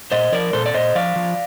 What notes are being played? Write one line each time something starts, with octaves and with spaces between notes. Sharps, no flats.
A#2 C5 D#5
F3 A#4 D5
A#2 A4 C5
D5
A#2 C5 D#5
F3 D5 F5
F3